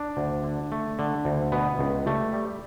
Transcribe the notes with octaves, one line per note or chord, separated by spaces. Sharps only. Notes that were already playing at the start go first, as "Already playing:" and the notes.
Already playing: D4
D2
D3
A3
D3
D2
B2 B3
C#2
G3 A3
G3